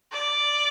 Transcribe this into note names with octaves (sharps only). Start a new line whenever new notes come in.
D5